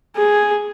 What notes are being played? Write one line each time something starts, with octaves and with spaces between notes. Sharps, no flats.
G#4